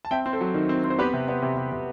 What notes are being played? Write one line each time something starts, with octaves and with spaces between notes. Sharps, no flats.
A5
C4 E5 G5
C4
A4 C5
F#3
D#3
C4
C4
C5
B3 G4 B4
C3
B3
C3
C3
C3